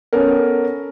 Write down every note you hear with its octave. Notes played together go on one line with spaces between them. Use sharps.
B3 C#4 A4 A#4